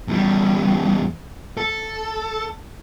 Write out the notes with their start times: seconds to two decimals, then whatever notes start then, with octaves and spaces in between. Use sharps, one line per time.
0.08 E2 G3
1.57 A4